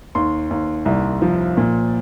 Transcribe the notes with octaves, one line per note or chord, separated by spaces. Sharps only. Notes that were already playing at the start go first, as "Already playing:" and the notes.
D#2 C6
D#2
C2
F3
A#2